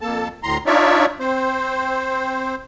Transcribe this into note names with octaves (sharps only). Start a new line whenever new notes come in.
F2 A#3 A4 A5
D2 A2 A#5 C6
D4 D#4 F4 C#5 D5 E5
C4 C5